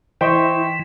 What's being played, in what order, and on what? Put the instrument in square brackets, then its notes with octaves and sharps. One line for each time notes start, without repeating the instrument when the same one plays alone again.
[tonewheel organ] E3 [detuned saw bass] E4 [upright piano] C5 D#5 [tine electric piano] G5 C6 C#6